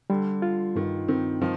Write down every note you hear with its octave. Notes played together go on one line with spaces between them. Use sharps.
D3 G3
F4
G2 D#3
D#3 C4
D#3 F3